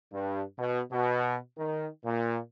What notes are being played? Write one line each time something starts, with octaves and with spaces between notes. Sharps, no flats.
G2
B2
B2
D#3
A#2